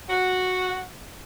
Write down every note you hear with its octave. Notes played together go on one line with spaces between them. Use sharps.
F#4